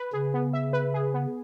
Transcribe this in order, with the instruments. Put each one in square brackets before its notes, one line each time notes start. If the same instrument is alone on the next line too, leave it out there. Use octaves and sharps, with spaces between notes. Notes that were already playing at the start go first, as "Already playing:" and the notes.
Already playing: [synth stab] B4
[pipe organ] C#3 [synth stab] G#4
[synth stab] B3
E5
B4
G#4
B3